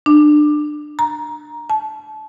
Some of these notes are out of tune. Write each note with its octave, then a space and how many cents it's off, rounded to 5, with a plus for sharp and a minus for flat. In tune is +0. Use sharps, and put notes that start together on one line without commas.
D4 +25
A#5 +10
A5 -30